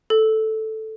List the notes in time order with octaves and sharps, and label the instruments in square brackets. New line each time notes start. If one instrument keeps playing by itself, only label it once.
[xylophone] A4